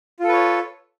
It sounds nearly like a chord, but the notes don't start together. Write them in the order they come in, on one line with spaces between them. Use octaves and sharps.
F4 A4 B4 C#5